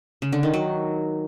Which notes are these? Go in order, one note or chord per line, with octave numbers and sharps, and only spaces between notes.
C#3
D3
D#3
F#3